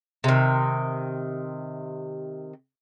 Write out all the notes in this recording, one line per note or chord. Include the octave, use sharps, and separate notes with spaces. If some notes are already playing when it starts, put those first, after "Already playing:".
C3 D#3